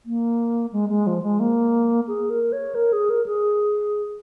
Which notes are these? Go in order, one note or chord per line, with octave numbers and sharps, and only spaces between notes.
A#3
G#3
G#3
F3
G#3
A#3
G#4
A#4
C#5
A#4
G#4
A#4
G#4